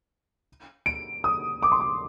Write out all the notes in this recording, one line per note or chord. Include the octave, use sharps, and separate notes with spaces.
D7
D#6
D6
C6
D6